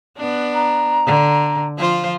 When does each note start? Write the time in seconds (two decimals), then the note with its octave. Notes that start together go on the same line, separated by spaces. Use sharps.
0.17 B3 D4
0.54 A#5
1.06 D3
1.78 F3 F4 C5